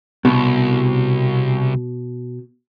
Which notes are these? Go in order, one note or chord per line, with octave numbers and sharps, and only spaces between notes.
C2 B2